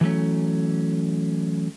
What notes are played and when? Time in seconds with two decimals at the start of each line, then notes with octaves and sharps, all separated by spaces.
0.01 E3 F#3 A3 C#4